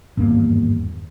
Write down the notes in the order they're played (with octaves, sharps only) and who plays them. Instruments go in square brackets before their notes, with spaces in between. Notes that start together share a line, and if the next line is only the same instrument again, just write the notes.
[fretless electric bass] G#1 E2 G2 A#3